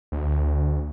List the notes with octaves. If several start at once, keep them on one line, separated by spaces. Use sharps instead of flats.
D2